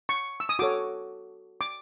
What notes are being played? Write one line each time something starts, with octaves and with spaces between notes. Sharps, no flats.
C#6
E6
D#6
F#4 A4 C#5 D6
D6